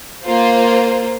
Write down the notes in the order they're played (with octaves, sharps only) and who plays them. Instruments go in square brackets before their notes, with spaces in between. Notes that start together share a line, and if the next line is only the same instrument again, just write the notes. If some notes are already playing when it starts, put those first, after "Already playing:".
[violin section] A#3 F4 C5